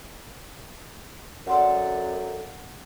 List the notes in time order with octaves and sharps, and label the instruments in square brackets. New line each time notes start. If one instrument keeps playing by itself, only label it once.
[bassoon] F#2 [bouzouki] A4 D5 F5 [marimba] F#5 C6